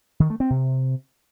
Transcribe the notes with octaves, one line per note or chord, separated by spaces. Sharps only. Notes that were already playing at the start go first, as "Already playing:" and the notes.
D#3
A3
C4
C3